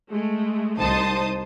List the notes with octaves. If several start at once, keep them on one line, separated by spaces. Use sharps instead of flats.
G#3 A3
C2 D#4 C5 A5 D#6